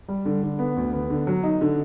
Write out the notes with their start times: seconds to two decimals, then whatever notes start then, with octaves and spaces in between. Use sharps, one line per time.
0.08 G3
0.25 D3
0.43 D3
0.59 B3
0.77 D2
0.93 B3
1.10 D3
1.27 F#3
1.43 D#4
1.61 D3